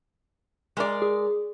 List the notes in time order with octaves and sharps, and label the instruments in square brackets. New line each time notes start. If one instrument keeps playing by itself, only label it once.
[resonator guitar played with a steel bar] G#3 A#4 D5
[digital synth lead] G#4